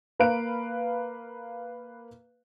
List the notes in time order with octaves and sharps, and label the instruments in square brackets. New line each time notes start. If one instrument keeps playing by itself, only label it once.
[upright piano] A#3 B4 F5 A#5 F#6 D7